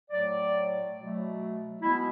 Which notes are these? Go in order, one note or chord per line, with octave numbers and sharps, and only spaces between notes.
A2 F#3 A3 D5
B2 F#3 A3
B2 G#3 B3 E4